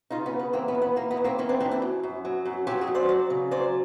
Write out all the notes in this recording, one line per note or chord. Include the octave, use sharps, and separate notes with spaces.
C#3 D#4 F4
B3 C#4
C#3
B3
E3 A#3 C4
B3 C#4
D#2
B3
E3 A#3
B3
D#2
A#3 C4
E3 B3 C#4
C4 D4
D#2 C4 D4
D4 E4
F#2
F#2
F#3
F#2
F#3 F4 G4
F#4 G#4
F#2
C5 D5
F#3
C#3
F#3 C5 D5